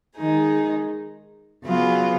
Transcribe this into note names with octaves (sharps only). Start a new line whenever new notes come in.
D#3 G#3 D#4 G#4
C#3 F#3 B3 F4 B4